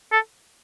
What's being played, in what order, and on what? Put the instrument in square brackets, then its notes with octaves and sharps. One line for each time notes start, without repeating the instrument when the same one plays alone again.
[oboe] A4